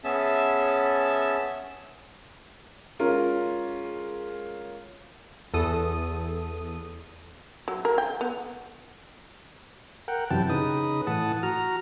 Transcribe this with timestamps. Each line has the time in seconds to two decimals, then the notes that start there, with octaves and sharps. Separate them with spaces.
0.04 B3 C#4 G#4 E5 A5
2.99 G#3 C#4 F4 A#4
5.54 E2 A4 D#6 D#7
7.68 F#3
7.85 A#4
7.98 G5
8.21 B3
10.08 A#4 F#5 G5
10.31 F#2 C3 E3 G5 A5
10.50 C#3 D#4 B4 D#6
11.07 A2 E3 F#5 A5 D#6
11.43 F#4 A#5 F6